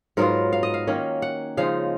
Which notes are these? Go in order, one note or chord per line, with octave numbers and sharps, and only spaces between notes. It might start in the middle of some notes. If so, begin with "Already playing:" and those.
G#2 F#3 B3 F4 A#4
F5
D#5
F5
D#3 A#3 C#4
F#5
C#3 F3 G#3 D#4 F5